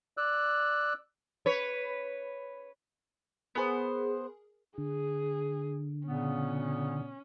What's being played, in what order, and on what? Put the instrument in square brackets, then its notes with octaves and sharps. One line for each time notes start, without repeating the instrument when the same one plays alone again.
[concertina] D5 E6 F#6
[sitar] B4 C#5
[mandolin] B3 C5 [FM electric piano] G#4 A#4
[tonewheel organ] D3 [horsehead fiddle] G#4
[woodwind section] A#2 C#3 B3 [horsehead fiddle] C#4